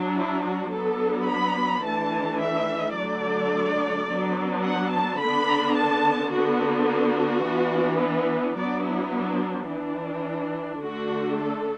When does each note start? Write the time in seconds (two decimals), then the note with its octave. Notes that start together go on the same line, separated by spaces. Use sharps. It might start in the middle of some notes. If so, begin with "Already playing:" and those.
Already playing: F#3 D4
0.15 E4
0.44 F#4
0.71 F#3 B3 D4 A4
1.27 B5
1.83 E3 A3 D4 A5
2.39 E5
2.96 D3 F#3 A3 D4 D5
4.08 F#3 B3 D4
4.64 F#5
4.92 A5
5.20 D3 B3 D4 B5
5.77 A5
6.33 D3 B3 D4 F#4
6.88 F#4
7.45 E3 B3 D4
8.01 B4
8.57 F#3 B3 D4 D5
8.85 E4
9.13 D4
9.69 E3 D4
10.81 D3 A3 D4 F#4
11.38 A4